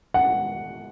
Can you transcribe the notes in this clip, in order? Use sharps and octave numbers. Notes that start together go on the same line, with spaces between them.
F#5